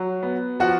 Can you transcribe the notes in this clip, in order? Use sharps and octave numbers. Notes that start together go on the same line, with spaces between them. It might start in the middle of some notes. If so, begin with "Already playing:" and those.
Already playing: F#3
B3
F3 F#4 F#5